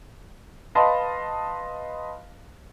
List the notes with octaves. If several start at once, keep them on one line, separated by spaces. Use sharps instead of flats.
B4 D#5 F5 A5 B5 C6